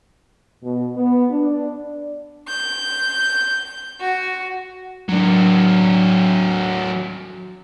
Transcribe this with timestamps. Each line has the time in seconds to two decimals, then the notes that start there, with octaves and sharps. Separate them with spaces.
0.63 B2
0.95 B3
1.30 D4
2.47 G6
4.01 F#4
5.09 F#3 D4